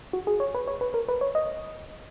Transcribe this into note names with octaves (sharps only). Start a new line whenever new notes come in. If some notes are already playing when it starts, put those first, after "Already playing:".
F#4
G#4
C#5
B4
C#5
B4
A#4
B4
C#5
D#5